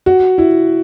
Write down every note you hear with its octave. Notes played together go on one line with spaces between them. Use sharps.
F#4
E4